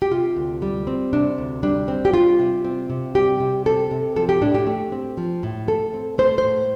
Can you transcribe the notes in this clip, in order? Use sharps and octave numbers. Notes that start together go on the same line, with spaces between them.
G4
C3 F4
D2
G3
C4
C3 D4
D2
G3 D4
C4
G4
G3 F4
C3
C4
C3
G3 G4
C3
C4 A4
C3
F3 A4
G4
A2 D4
G4
A3
C4
F3
A2
A3 A4
C4
A3 C5
C5
A2